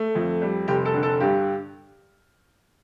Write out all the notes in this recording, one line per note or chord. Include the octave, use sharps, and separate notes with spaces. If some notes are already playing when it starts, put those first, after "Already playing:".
Already playing: A3
F2
G3
F1 G4
A4
D3
A4
G2 G4